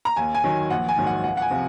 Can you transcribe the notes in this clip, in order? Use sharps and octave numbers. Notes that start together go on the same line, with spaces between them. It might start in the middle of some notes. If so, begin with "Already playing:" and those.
A#5
D#2 G#5
G#5
D#3 F#3
A#1 F#5
G#5
G#2 D#3 F#3
F#5
C#2 F#5
F#5
G#5
C3 F3